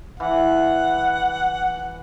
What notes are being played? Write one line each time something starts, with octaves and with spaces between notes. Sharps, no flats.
E3 F#5